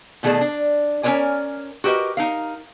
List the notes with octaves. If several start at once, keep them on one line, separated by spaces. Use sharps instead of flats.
B2 D#3 A3 G#4 D5 A5
D4
C#4 A#4 B4 C#5 D5 G#5
F#4 G4 A#4 B4 D#5
D#4 A#4 F5